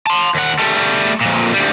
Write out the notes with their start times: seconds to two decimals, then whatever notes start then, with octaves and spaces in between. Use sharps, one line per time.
0.07 A5 C6
0.35 D#2 F#5
0.59 G3 A3
1.21 F2 A#2
1.54 D2 G3